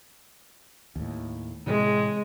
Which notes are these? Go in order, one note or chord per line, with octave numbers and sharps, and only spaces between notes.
D#2 A2
A2 C3 E3 G#3